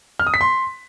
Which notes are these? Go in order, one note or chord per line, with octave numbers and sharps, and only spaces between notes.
F6
D#6
B6
C6